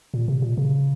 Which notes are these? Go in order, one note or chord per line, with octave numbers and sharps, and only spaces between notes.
A#2
C3
A#2
C#3